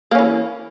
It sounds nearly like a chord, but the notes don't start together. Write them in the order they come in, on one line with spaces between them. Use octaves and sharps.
A#3 C#4 E3